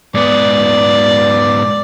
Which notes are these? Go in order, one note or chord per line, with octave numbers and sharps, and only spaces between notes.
G#2 B3 D5